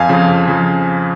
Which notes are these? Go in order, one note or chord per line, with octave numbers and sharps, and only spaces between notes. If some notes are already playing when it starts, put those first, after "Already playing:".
Already playing: F2 F5 G#5
C#3 F3
F2
C#3 F3